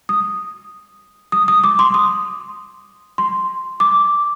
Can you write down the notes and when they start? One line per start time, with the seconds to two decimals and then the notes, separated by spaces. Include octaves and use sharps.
0.09 D#6
1.32 D#6
1.48 D#6
1.64 D6
1.79 C6
1.94 D#6
3.18 C6
3.80 D6